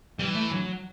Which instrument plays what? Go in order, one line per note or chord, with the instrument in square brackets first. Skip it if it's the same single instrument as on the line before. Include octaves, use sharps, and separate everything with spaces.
[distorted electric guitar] E3 [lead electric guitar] G3
[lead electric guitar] A3
F#3